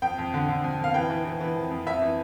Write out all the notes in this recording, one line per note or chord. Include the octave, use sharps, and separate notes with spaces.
F2 G5
F2
D3
D3
F2
F2 F5
E3 G5
E3
E3
E3
F2
F2
F2 E5
E3